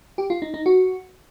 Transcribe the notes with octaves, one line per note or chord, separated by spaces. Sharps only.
G4
F4
D#4
D#4
F#4